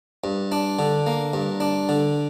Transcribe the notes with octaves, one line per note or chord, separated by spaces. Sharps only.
G2
D4
D3
A#3
G2
D4
D3